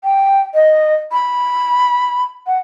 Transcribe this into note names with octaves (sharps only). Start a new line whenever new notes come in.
G5
D#5
B5
F#5